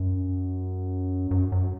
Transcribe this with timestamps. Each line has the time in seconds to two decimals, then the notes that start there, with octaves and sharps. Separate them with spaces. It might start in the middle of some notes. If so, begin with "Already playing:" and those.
Already playing: F#2
1.31 F#2
1.52 F#2